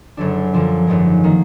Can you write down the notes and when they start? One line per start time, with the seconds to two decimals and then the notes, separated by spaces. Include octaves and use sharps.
0.17 F#1 F#2 D3 F#3 D4
0.53 F#2 D3 F3 A#3 D4
0.87 G#1 F#2 F3 G#3
1.24 D#3 A#3